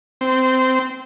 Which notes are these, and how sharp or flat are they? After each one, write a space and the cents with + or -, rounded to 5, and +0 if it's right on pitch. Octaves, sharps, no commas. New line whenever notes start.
C4 -15